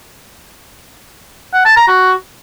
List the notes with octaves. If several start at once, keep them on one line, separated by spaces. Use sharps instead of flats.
F#5
A5
A#5
F#4